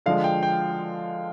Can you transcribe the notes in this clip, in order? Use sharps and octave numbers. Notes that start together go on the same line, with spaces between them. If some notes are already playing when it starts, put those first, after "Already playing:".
D3 F3 G#3 F5
G5
G5